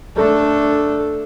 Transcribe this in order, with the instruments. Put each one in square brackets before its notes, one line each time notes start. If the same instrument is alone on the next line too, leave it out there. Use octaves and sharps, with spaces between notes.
[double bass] A3 D4 [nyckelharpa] A4